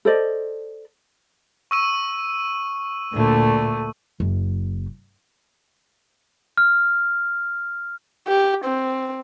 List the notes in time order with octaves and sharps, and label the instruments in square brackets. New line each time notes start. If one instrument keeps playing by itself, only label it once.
[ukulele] A4 C5 D5 D#5
[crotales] C#6 E6 D#7
[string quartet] D2 D3 A3 [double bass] A#2
[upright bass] F#1
[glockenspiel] F6
[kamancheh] G4
C4